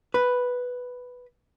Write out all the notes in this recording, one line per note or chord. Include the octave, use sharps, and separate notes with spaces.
B4